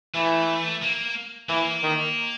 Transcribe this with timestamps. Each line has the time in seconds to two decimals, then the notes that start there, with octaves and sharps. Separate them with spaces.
0.15 E3 A3
0.82 A#3
1.49 E3 A#3
1.83 D#3